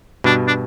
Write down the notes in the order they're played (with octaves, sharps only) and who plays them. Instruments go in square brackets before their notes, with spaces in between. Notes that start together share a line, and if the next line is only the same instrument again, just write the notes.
[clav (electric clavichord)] G2 B2 [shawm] D4
[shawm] D4